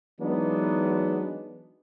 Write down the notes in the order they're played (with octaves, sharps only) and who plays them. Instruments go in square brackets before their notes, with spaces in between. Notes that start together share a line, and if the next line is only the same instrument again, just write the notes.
[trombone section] E3 F#3 G#3 B3 D4 D#4